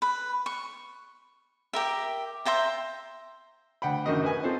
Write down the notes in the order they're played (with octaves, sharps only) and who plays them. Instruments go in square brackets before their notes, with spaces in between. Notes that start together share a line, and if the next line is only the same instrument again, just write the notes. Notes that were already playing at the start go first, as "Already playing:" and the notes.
[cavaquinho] B4
C#6
G4 A#4 E5
C5 E5 G5 A#5
[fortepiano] D2 F#5 G5 B5
F#2 D3 D#3 F#4 A#4 D#5
B4 G#5
C4 F4 A4 C5